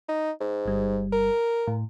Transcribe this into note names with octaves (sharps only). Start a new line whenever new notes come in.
D#4
G#2
G1 G3
A#4
A2